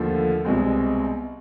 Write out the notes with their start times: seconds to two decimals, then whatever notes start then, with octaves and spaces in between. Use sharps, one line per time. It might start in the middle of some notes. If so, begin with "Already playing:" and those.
Already playing: D#2 D3 F3 A3
0.45 C2 B2 G#3 C4